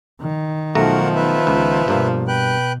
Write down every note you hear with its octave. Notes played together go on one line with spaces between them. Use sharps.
D#3
B1 F3 A3 F#4 A#4 F#5 A#5
B3 B4 E5
C#2
G2 B2 A#3
B4 G5 F#6